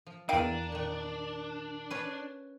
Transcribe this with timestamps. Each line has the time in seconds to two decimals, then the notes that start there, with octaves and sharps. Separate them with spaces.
0.07 F3
0.29 E2 A#3 D4 F5 G5 D7 D#7
0.72 A#2 D#3
1.90 C#4 B4